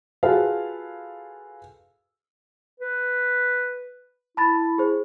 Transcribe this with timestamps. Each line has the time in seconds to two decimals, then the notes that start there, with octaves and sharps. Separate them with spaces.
0.23 F4 F#4 G#4 A4 B4 F5
2.80 B4
4.37 E4 A5 B5 A6
4.78 G#4 C5